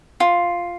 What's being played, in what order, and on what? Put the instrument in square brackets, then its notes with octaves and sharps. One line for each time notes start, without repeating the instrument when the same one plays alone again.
[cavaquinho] F4